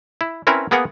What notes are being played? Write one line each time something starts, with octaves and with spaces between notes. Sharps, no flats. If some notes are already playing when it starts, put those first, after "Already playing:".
E4
C4 C#4 E4 A#4 B4
A#3 B3 G#4 A#4 F#5